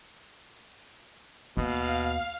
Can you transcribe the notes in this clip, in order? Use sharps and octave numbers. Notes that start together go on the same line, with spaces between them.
D#2 B2 F5